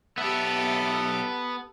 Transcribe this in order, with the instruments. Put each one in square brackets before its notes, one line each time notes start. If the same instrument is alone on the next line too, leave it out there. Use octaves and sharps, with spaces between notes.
[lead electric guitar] B1 E5 [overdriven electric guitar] B3 [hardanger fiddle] G4 A4